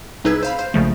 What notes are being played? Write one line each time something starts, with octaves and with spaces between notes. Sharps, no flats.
C2 D#4 G#4 B4 E6 G#6
C5 F5 B5
C5 F5
A#1 C#3 F3 A3